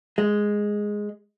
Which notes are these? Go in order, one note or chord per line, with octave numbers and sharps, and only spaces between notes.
G#3